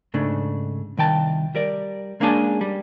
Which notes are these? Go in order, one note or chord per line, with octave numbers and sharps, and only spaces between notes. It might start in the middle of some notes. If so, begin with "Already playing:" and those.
G#2 C#3 A3 D4
C2 D#3 G5 A5
G3 A#4 D5
G#3 A#3 C#4 D4 G#4 A5
G3